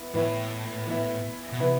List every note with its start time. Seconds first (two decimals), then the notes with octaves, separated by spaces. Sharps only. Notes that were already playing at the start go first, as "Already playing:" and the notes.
Already playing: B3 E4
0.14 A2 E3 B3 E4
0.87 E3 B3 E4
1.52 B2
1.60 C3 E3 B3 E4